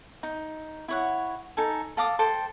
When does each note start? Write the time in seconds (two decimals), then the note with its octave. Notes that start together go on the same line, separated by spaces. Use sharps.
0.23 D#4
0.88 E4 C#5 F#5
1.57 D#4 A4 G#5
1.97 A4 F5 D6 D#6
2.19 A4 C5 G5